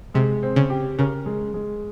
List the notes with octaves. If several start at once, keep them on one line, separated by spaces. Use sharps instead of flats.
C3 G#3
C4
C#3
G4
C#3 A#4
G#3
G#3